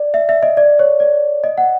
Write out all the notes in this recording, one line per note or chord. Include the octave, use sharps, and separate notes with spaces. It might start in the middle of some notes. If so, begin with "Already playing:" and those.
Already playing: D5
E5
E5
D#5
D5
C#5
D5
D#5
F#5